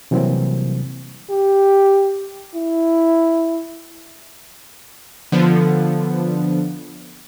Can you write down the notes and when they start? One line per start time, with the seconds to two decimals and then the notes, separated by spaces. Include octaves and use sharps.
0.11 C3 E3 F#3 G3 A#3 C4
1.30 G4
2.55 E4
5.32 D3 F3 B3